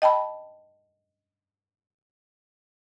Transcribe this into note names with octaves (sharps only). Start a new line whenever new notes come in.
D#5 G5 A5 B5